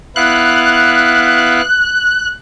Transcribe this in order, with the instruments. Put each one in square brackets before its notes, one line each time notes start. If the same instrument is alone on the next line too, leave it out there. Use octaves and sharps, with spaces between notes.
[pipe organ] B3 E4 F5 [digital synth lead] F#6